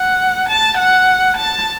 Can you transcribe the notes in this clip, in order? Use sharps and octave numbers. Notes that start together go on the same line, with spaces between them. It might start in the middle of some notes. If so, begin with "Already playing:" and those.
Already playing: F#5
A5
F#5
A5